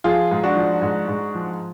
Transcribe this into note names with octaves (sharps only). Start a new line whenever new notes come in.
F3 F4 G#4
G#2
D4 F#4
F3
G#2
G#2
F3